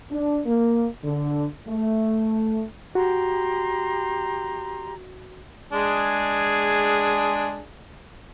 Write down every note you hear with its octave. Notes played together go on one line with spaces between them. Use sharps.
D4
A#3
D3
A3
F#4 G4 A#5 C6
G#3 D4 G#4